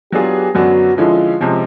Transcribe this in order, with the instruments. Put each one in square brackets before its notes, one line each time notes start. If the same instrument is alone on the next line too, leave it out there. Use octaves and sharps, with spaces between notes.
[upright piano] F#3 B3 D4 F4 G#4 [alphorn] G4
[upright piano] F#2 D3 F#3 B3 D4 [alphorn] F#4
[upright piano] D3 F3 G#3 C#4 E4 [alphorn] F4
[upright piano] C3 F3 G#3 C#4